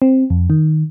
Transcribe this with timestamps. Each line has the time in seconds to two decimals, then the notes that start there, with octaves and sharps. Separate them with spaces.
0.02 C4
0.30 F2
0.50 D#3